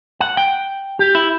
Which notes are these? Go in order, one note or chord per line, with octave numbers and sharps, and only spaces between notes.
F#5
G5
G4
E4